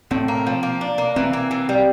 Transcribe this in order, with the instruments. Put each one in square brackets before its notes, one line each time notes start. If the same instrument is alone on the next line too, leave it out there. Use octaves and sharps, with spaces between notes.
[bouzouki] A2 [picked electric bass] C4
[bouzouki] A#3
F3
A#3
D4
A#3
[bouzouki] E3 [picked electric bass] C4
[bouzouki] A#3
E3
G3